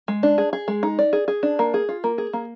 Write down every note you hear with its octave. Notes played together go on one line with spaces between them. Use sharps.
G#3
D4
G#4
G#4
G#3
D#4
D5
G#4
G#4
D4
A#3
G#4
F4
A#3
G#4
A#3